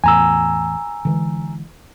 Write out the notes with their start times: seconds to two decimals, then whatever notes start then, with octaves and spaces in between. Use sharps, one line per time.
0.04 E2 A2 G#5 A#5 E6
1.05 D3 E3 G#3